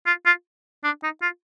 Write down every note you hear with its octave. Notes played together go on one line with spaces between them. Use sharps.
F4
F4
D4
D#4
F4